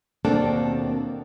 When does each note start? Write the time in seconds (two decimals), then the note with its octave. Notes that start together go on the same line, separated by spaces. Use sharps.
0.25 D#2 B2 A#3 C4 D4 A4